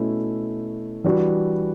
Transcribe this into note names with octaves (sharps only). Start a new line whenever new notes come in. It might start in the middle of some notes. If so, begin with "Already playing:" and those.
Already playing: B2 A3 C#4 E4
E3 G3 D4 F#4